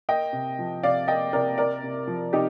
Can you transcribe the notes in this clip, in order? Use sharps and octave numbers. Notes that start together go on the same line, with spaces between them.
A#3 D#5 G5
C3
F3
C3 D5 F5
A#3 D#5 G5
C3 A#4 D5
A#3 A#4 D5
C3
F3
C3 D#4 G4